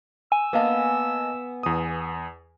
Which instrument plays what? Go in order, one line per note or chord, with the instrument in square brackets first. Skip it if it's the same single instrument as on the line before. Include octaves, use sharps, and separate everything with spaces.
[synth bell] G#5 [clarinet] E6
[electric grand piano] A#3 D#5 A5 [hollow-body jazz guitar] B3 F5
[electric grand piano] E2 D#6